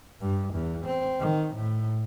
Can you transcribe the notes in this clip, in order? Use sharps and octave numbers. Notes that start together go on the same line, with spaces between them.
G2
E2
C4
D#3
A2